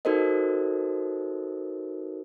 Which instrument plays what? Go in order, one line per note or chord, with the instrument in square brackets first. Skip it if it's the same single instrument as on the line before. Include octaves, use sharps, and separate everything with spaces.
[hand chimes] D#4 F#4 A4 A#4 C5 D#5